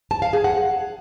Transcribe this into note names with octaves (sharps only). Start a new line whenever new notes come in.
A5
F5
G#4
F#5